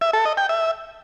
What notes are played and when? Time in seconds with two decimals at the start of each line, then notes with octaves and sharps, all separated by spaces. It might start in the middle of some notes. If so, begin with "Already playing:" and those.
0.01 E5
0.13 A4
0.25 D#5
0.37 G5
0.49 E5